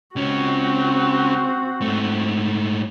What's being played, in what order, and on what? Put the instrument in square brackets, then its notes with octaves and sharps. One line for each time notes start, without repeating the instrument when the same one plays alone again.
[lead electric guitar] C#2 C#4 [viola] C4 F#4
[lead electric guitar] G#2 A3